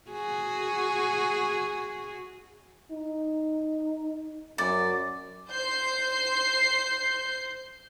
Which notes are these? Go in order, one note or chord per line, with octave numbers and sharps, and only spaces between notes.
F#4 G#4
D#4
F#2 D5
C5 G6 C7